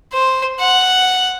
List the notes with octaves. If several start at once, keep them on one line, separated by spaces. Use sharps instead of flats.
C5
F#5